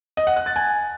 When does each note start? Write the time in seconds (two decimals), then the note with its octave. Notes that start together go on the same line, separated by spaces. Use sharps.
0.17 D#5
0.27 F#5
0.37 F#6
0.46 A6
0.56 G#5